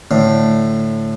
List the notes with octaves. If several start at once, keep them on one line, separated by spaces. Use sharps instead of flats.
A2 D3